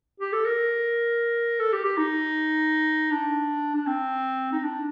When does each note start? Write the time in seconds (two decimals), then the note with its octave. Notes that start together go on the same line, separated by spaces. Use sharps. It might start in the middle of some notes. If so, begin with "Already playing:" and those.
0.20 G4
0.33 A4
0.45 A#4
1.60 A4
1.72 G4
1.85 G4
1.98 D#4
3.11 D4
3.75 D4
3.87 C4
4.52 D#4
4.63 D4